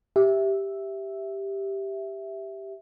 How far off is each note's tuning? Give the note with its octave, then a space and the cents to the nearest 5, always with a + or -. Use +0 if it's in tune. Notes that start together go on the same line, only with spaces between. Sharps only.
G4 +0 E5 +0